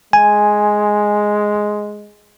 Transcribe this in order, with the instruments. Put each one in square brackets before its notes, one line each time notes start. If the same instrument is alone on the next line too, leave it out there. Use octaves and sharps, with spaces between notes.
[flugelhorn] G#3 [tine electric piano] G#5